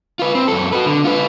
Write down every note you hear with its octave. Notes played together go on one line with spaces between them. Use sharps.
F4 B4
C4
F#2 A4
F#4 B4
D3
F4 B4